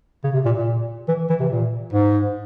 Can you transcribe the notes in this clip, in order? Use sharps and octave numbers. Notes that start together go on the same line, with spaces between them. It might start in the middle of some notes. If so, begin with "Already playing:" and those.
C#3
C3
A#2
A#2
E3
E3
C3
A#2
G#2